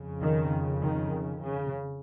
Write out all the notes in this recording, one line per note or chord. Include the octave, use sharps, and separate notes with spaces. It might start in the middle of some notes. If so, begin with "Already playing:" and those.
Already playing: F2 C#3
D#3
D#3
C#3